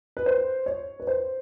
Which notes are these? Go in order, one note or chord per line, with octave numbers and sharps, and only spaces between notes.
B4
C5
C#5
B4
C5